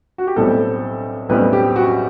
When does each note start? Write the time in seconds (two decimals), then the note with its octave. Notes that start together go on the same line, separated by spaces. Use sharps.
0.18 F#4
0.27 G4
0.36 B1 A2 G3 C4 A4
1.29 B1 A2 G3 C4 B4
1.53 G4
1.76 F#4